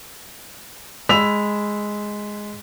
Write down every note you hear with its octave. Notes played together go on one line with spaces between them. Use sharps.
G#3 B5 E6 B6 F7